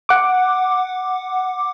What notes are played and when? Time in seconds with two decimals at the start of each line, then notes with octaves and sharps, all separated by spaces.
0.09 F#5 D6